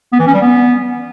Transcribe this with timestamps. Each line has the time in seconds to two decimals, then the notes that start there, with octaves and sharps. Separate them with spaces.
0.12 B3
0.20 E3
0.27 C#4
0.34 G3
0.41 B3